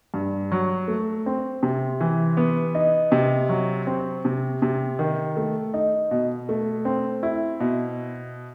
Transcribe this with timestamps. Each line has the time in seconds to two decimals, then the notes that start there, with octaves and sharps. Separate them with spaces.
0.14 G2
0.52 F#3
0.88 A3
1.26 C4
1.63 C3
2.00 E3
2.37 B3
2.75 D#4
3.12 C3
3.49 F#3
3.87 C4
4.25 C3
4.62 C3
4.99 D#3
5.37 A3
5.74 D#4
6.11 B2
6.49 A3
6.85 C4
7.23 E4
7.60 B2